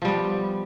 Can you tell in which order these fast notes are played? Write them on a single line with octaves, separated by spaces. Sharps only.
F3 G3 B3